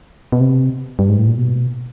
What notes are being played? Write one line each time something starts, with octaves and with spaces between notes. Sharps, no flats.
B2
C3
G2
G#2
A2
A#2
B2